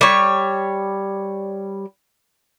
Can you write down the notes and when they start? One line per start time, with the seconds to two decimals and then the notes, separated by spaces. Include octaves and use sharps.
0.01 G3 C#5